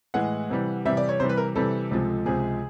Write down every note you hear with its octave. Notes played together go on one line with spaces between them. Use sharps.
A2 E3 G#3 F#5
C3 E3 G3
C3 E3 G3 E5
D5
C#5
C3 E3 G3 C5
B4
A#4
C3 E3 G3 A4
C#2 C3 F3 G#3
C#2 C3 F3 G#3 G#4